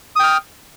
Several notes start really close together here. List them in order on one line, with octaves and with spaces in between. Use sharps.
D#6 G5 F6